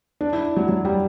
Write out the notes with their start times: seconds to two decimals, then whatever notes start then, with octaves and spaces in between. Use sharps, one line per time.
0.21 D4
0.33 E4
0.56 F#3
0.69 F#3
0.85 G3